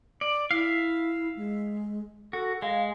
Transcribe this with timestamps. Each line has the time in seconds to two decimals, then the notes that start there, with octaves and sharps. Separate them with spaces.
0.21 D5
0.51 E4 E5 F5
1.37 G#3
2.33 F#4 A4
2.62 G#3 F5